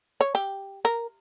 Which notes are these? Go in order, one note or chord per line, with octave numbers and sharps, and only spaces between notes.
C#5
G4
A#4